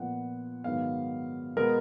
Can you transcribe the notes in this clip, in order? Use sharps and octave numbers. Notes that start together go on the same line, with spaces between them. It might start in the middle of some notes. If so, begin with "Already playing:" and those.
Already playing: A#2 F3 B3 F#5
G#2 D#3 F#3 B3 F5
B2 G#3 B3 A#4